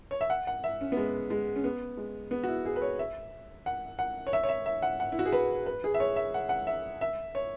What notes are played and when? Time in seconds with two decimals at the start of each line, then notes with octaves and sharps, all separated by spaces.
0.11 C#5
0.21 E5
0.30 F#5
0.47 F#5
0.64 E5
0.81 C#4
0.92 B3
0.97 G#3
1.30 G#3
1.56 C#4
1.64 B3
1.97 G#3
2.31 B3
2.43 F#4
2.48 E4
2.65 G#4
2.76 B4
2.82 C#5
2.99 E5
3.66 F#5
3.99 F#5
4.27 C#5
4.33 E5
4.43 C#5
4.49 E5
4.66 E5
4.82 F#5
5.00 F#5
5.12 E4
5.19 F#4
5.25 G#4
5.33 B4
5.66 B4
5.84 G#4
5.94 E5
6.00 C#5
6.16 E5
6.34 F#5
6.49 F#5
6.67 E5
7.01 E5
7.35 C#5